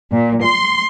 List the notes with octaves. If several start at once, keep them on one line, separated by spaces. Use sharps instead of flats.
A#2
C6